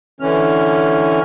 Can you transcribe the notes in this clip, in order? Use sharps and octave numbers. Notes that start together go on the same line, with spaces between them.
D3 E3 C#4 F6